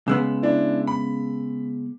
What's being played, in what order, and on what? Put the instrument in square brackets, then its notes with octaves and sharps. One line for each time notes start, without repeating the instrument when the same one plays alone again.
[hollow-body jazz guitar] C#3 G#3 B3 [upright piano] E6
[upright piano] D4 E4
B5